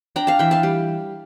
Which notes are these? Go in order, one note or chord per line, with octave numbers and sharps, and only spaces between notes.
D4 G5 A#5
F5 A5
E3 E5 G5
F5 A5
G3